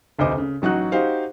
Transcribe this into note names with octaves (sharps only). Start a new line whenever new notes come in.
F1 D2 C5 D#5 D6
C#3
A1 F#3 D#4 F#4 F#6
D#4 F#4 G4 C5 F5